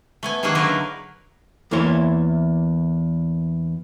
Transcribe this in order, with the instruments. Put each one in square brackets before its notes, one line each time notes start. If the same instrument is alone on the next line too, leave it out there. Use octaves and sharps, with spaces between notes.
[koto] A3 B3 G#5
D#3 F#3 A#3 C#4 G#4 F#5
D3 F#3 D#4 E4 A#4 B4
[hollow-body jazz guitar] E2 E3 A#3 E4 C#5 C6